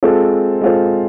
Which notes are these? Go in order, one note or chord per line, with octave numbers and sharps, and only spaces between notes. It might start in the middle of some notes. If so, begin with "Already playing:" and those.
G#3 C4 F4 A4 C5
G#3 C4 F4 A4 C5